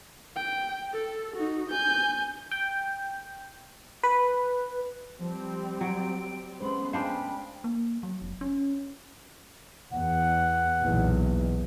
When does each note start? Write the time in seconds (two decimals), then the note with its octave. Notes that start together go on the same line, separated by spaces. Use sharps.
0.36 G5
0.94 A4
1.36 D#4 F#4
1.70 G#5 G6
2.51 G5
4.03 B4
5.19 F3 G3 C4
5.81 F#3 D7
6.60 G#3 A3 B3 C#4 C5 B5 C6
6.93 G#3 D4 C5 F5 G5 B5
7.64 A#3
8.03 F#3
8.22 F1
8.41 C#4
9.92 E2 F#5
10.82 B1 E2 A#2